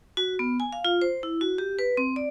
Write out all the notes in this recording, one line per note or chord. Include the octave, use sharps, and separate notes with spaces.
F#4
B3
G#5
F5
F4
C5
E4
F#4
G4
B4
C4
D5